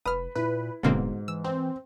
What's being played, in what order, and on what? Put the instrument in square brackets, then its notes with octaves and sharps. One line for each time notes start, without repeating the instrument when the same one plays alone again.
[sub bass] F1 [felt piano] B4 B5 [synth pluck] D#6 F6
[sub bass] A#2 [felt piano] E4 [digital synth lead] B4
[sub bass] D#1 [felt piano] G#2 [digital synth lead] B2 [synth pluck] D3 A#3 C4
[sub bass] E3 [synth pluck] E6
[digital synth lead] C4 [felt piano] C6